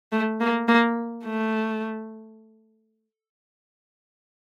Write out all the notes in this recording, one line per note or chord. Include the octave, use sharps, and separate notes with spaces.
A3
A#3
A#3
A3